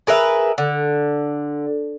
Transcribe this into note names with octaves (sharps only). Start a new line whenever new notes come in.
G#4 A#4 B4 E5
D3